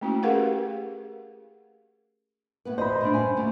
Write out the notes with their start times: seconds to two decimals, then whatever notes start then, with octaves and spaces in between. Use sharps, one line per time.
0.01 A3 A#3 C#4 E4 F#4
0.23 G4 G#4 A#4 B4 F5 F#5
2.65 A2 B3 B4
2.78 C5 D#5 B5
3.01 A2 C3 D4
3.14 G2 C#4 G#5
3.37 D2 A3